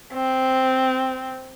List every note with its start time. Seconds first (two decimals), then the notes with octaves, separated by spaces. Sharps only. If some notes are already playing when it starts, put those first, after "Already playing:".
0.13 C4